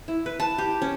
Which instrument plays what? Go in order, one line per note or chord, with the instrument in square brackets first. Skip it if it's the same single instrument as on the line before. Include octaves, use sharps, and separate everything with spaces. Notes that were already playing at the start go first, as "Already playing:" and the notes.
[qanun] E4
B4
A5
G4
C#4